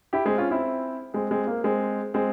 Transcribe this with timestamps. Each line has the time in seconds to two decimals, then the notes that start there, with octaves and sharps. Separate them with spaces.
0.13 E4 G4
0.26 G#3 C4
0.38 C#4 F4
0.51 C4 E4
1.14 G#3 C4
1.31 G#3 C4
1.47 A#3
1.64 G#3 C4
2.14 G#3 C4